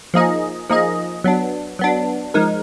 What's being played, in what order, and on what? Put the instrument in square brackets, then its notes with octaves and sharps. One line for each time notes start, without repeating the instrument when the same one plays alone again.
[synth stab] F3 A#3 D#4 G#4 D#5
F3 A#3 D#4 G#4 D#5
F#3 B3 D4
F#3 B3 D4
F3 G#3 D#4 A#4